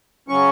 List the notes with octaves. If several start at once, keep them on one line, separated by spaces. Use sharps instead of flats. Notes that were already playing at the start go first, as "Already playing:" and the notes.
C#3 F#3 C#4 C#6